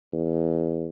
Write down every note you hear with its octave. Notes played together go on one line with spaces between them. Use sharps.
E2